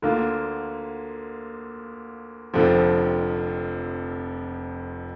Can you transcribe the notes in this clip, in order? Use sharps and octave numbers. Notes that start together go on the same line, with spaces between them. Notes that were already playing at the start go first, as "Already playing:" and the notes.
D2 D3 A#3 F4
F1 F2 D3 F3 C4